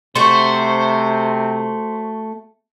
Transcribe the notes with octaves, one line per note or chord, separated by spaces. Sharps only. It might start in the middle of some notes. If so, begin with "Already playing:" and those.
C3 A3 F#4 C5